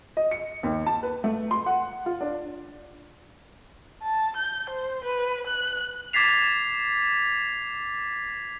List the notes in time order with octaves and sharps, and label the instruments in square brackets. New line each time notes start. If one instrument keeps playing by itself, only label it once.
[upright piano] D#5
C#7
D#2
A5
B4
A3
C6
F#5
F4
D4
[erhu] A5
G6
C5
B4
F#6
[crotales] D6 G#6 A6 B6 C7 F7